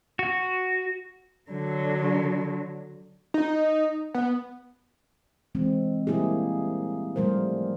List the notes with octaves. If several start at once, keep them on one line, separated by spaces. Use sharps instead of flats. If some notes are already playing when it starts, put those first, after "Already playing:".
F#4
D3 F#3
D#4
B3
E3 G#3 C4
G3 A#3 E4 G4 G#4
F3 G3 A3 A#4 C5